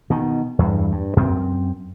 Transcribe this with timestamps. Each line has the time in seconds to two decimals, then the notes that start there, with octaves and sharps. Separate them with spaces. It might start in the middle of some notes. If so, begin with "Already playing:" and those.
0.10 B2 D#3
0.59 E2 G2
0.92 G2
1.17 F#2 C4